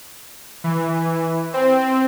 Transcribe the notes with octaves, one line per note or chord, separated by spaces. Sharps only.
E3
C4